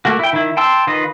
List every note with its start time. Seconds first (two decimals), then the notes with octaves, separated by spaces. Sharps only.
0.05 A3 A#3 F#4
0.19 E4 G5
0.33 D#3 E4
0.57 G5 A5 C6 E6
0.87 D#3 F4 B4 D#5